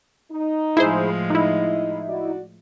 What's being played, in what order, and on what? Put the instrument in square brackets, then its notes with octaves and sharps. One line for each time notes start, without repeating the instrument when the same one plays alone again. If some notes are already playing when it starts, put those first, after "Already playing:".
[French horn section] D#4
[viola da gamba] A2 F3 G#3 [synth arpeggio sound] E4 G#4 C5
[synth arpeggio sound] D#4 E4 [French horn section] D#5
[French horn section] F#4 D5